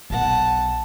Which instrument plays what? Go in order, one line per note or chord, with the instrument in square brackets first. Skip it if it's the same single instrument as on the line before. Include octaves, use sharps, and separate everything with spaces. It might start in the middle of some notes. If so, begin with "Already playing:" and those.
[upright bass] B1 B2 [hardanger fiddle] F#5 A5